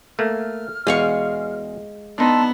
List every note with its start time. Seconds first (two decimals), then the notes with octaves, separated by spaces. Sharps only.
0.19 A3 A#3 F6
0.87 E2 B2 G#3 F5 C#6
2.18 B3 D4 D#4 A5 C6 E6